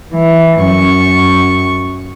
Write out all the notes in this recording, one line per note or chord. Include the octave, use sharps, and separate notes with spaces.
E3
F#2 C#6